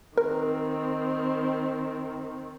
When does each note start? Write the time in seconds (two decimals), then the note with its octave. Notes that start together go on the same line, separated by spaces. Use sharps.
0.18 D#3 C4 A#4